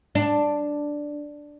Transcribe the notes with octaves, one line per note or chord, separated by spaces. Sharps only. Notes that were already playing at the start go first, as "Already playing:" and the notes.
D4